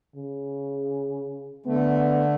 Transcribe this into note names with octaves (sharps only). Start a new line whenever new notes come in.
C#3
D3 A3 B3